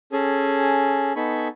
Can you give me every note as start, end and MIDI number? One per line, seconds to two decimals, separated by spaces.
0.12 1.13 61
0.12 1.13 68
0.12 1.13 69
0.12 1.13 80
1.16 1.48 59
1.16 1.48 63
1.16 1.48 69
1.16 1.48 80
1.16 1.48 83
1.16 1.48 85